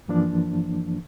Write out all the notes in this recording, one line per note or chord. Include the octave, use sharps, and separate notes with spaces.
G2 E3 F3 A#3 D4